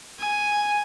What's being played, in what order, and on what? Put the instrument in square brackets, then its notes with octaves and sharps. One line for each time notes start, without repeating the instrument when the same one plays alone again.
[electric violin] G#5